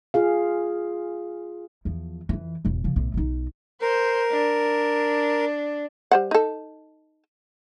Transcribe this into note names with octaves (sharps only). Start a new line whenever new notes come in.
F4 G#4 F5
E2 F3
F2 E3
E1 A1
C#3 F3
B1 A2
B1 D#4
A#4 C5
D4
G3 C5 F#5
D#4 A4